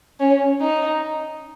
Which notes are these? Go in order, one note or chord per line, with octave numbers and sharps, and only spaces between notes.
C#4
D#4